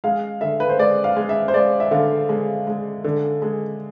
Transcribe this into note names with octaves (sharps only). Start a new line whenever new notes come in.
G#3 F5
D3 E5
B4
C5
G#3 D5
F5
G#3
E5
C5
G#3 D5
E5
D3 F5
G#3
G#3
D3
G#3